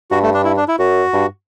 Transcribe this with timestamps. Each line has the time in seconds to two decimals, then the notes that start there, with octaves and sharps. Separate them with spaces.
0.11 G2 F#4
0.22 A3
0.34 D4
0.45 E4
0.56 D4
0.68 E4
0.79 F#2 F#4
1.13 G2